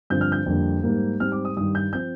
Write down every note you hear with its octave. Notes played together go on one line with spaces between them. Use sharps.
G2 D3 F3 C4 G6
F6
G6
F2 D3 G3 A#3
G#2 G3 A#3
G#2 G3 C4 F6
D6
D#6
G2 D#3 G3 D#6
G6
F3 C4 G6